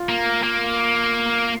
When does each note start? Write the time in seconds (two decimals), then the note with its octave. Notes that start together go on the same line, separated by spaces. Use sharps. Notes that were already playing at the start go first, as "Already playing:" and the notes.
Already playing: F4
0.09 A#3
0.43 A#3